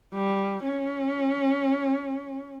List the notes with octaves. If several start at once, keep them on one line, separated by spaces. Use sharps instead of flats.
G3
C#4